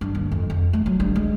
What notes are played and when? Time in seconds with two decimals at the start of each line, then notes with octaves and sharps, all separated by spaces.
0.01 G2
0.15 D#2
0.32 F2
0.50 F2
0.73 A3
0.86 F#3
1.00 G2
1.16 G#3